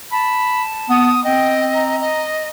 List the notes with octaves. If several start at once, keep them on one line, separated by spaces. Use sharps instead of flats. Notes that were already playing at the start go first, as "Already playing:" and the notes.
A5 B5
B3 D#6
C4 D#5 G5
A#5
D#5